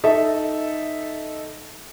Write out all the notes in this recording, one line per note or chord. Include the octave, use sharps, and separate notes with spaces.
D#4 A4 D#5 E5